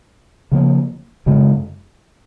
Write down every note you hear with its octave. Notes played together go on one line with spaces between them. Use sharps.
C#3 F3 A#3
F#2 C#3 G#3